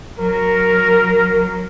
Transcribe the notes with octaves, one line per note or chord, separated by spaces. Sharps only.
F#3 A#4